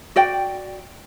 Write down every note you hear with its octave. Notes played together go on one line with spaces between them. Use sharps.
F#4 D5 G5